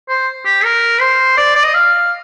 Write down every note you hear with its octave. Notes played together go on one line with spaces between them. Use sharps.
C5
G4
A#4
C5
D5
D5
D#5
F5